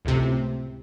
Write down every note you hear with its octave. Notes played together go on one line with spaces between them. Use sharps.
C#2 A2 C3